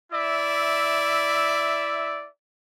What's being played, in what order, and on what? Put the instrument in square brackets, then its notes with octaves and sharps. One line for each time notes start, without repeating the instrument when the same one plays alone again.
[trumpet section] E4 D5 E5